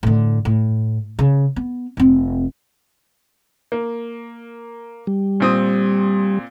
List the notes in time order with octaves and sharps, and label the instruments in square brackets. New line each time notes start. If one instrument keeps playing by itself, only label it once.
[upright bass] A2 D3
A2
C#3
B3
F1 C4
[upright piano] A#3
[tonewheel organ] G3
[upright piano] A#2 C4 D#6